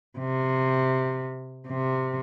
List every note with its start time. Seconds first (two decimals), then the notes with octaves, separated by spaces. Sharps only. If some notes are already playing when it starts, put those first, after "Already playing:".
0.19 C3
1.67 C3